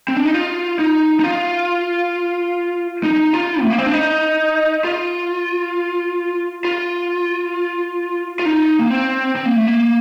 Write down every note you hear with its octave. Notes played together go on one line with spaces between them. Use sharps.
C4
D4
D#4
F4
D#4
D#4
F4
D#4
F4
A3
A#3
C4
D4
D#4
F4
F4
F4
D#4
A#3
C4
C4
A#3
A3
A#3